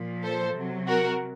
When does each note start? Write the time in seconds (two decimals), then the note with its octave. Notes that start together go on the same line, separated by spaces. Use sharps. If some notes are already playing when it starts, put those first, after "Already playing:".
Already playing: A#2 F3
0.23 A4 C5
0.55 C3 F#3
0.87 F#4 A#4